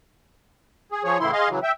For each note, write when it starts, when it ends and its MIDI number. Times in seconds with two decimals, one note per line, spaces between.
0.92 1.04 68
1.04 1.18 53
1.04 1.18 68
1.04 1.18 73
1.20 1.31 45
1.20 1.31 49
1.20 1.31 52
1.20 1.31 64
1.20 1.31 84
1.32 1.49 68
1.32 1.49 75
1.32 1.49 77
1.32 1.49 84
1.49 1.59 49
1.49 1.59 52
1.49 1.59 54
1.63 1.72 76
1.63 1.72 79